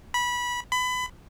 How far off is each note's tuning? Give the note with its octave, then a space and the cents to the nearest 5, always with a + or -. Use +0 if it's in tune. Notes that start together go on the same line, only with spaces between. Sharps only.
B5 -20
B5 +25